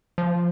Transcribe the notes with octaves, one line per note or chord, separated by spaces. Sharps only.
F3